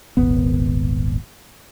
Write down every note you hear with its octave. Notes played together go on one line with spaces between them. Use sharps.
D#1 G#1 B3